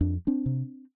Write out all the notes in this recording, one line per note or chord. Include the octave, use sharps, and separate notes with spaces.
F2 D4
C4 D4
C3